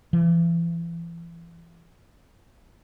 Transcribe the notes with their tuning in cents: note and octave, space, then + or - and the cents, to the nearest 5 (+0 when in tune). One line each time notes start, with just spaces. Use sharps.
E3 +35